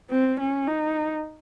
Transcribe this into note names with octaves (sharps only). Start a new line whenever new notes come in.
C4
C#4
D#4